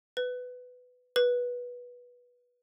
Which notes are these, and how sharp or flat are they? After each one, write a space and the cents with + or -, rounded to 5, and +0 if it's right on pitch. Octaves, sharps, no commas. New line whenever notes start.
B4 +15
B4 -15